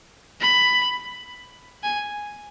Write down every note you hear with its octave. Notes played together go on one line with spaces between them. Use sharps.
B5
G#5